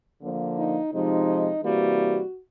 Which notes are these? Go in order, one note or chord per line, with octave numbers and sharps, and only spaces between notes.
D3 F3 A#3
D#4
C3 F3 G#3 D#4
C3 E3 G3 A#3 F#4